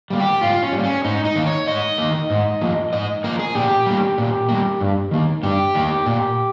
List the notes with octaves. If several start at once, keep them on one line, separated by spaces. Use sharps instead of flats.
G3 A#3
G4
G#2 F4
C#4
G3
A#3
C#4
G#2 D#4
D#4
D#3 A#3
C#5
G#2 D#5
D#3 A#3
G#2
F3 A#3
G#2 D#5
F3 A#3 A#4
G#4
A#2 G4
G3 A#3
A#2
G3 A#3
G2
D#3 A#3
G2 G4
D#3 A#3
A#2